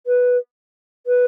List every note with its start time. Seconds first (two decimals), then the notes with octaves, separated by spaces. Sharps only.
0.06 B4
1.06 B4